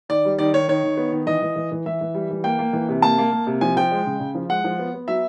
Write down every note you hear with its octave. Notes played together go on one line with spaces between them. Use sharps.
D#3 D5
G3
D#3 D5
D#3 C#5
D#3 C#5
D#3
B3
D#3
E3 D#5
E3
E3
E3
E3 E5
E3
G3
E3
A#3 G5
A#3
E3
C3
A#3 A5
A#3
A#3
C3
F3 G#5
F3 G5
G#3
C#3
C#3
F3
G#3 F#5
F3
B3
B3
F#3 E5